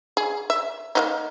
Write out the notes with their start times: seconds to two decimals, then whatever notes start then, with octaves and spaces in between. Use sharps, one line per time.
0.17 G#4
0.50 E5
0.95 A#3 C#4 D#4